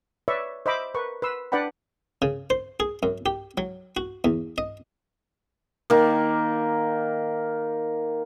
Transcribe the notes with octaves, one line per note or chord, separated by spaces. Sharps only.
B4 C#5 D5 E5 C#6
C5 D#5 E5 B5 D6
A#4 B4 C#6
B4 C6 E6
D4 B4 D5 F#5 G5 B5
C#3
C5
G#4
F#2
G4
F#3
F#4
E2
D#5
D#3 A#3